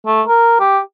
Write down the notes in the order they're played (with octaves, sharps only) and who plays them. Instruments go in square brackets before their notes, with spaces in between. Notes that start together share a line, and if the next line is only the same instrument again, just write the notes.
[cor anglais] A3
A#4
G4